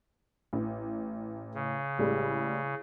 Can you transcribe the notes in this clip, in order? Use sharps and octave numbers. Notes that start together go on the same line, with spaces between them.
A1
C#3
A1 G3 G#3